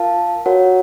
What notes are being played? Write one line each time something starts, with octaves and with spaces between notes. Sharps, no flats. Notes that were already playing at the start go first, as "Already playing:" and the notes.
Already playing: F4 A#4 F5 A5
F#4 A#4 C#5 F#5